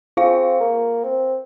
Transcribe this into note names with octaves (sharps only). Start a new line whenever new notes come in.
C4 F4 F5
A#3
C4